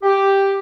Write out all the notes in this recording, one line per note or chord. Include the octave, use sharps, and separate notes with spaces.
G4